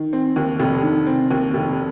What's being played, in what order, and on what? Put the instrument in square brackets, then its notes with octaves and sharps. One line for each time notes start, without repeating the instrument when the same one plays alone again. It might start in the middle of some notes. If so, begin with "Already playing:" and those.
Already playing: [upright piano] D#3
C4
D#2
F1
D#3
C4
D#2
F1